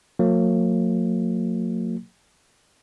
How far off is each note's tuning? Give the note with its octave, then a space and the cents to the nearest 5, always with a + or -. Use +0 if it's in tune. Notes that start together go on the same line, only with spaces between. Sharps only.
F#3 -40 A#3 -35